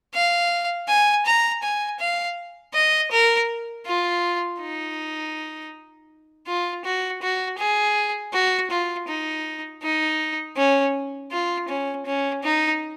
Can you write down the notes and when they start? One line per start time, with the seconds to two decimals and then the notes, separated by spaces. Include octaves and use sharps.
0.14 F5
0.88 G#5
1.26 A#5
1.63 G#5
2.00 F5
2.74 D#5
3.12 A#4
3.86 F4
4.61 D#4
6.47 F4
6.85 F#4
7.22 F#4
7.59 G#4
8.33 F#4
8.71 F4
9.08 D#4
9.83 D#4
10.57 C#4
11.32 F4
11.69 C#4
12.06 C#4
12.43 D#4